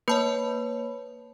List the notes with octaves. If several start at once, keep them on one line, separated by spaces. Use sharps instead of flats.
A#3 B4 C#5 A5 B5